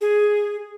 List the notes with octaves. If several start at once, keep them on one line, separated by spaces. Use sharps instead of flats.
G#4